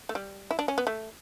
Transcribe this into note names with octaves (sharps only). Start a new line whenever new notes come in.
A3
G3
E4
D4
C#4
B3
A3